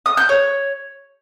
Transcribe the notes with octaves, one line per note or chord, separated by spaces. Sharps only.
D#6
G6
C#5